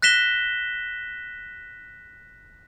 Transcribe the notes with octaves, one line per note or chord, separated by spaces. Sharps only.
F#6 A#6 B6 E7 G7